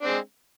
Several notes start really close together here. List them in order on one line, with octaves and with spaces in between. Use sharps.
D4 C4 G#3